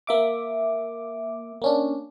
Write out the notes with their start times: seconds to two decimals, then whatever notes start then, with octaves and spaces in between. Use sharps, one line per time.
0.07 A#3 E5 D6
1.62 A#3 C#4 D4